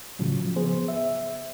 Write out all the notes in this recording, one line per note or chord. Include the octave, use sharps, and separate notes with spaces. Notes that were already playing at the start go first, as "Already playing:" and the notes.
A2 C#3 F3 F#3
B3 G#4 C5
E5